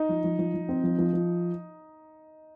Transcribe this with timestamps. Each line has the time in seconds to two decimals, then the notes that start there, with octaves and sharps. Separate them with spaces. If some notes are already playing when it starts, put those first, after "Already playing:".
Already playing: D#4
0.09 F3
0.24 F3
0.39 F3
0.54 F3
0.69 C4
0.83 F3
0.98 F3
1.13 F3